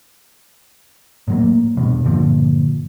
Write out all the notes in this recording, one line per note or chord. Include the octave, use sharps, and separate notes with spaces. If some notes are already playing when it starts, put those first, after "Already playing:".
A2 F#3 A#3
E2 G2 B2
G2 A#2 D3 F3